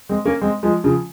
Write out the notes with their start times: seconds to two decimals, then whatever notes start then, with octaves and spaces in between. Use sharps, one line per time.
0.09 G#3 C4
0.25 A#3 C#4
0.41 G#3 C4
0.63 F3 G#3
0.84 C#3 F3